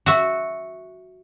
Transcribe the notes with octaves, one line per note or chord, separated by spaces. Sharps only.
F#4 E5